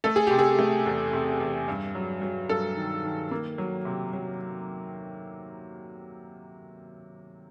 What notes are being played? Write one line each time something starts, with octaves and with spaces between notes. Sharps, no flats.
A3 A4
G#4
C3 G4
G#4
A3
E2
C3
E2
G2
F#3
F#3
G2 A4
D#3
D#3
A#3
F#3
C3
F#3